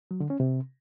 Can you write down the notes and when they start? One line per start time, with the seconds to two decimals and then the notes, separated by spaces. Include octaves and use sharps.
0.11 F#3
0.20 D3
0.30 C#4
0.40 C3